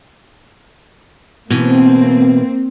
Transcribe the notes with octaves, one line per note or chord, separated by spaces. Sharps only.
B2 E3 A#3 C4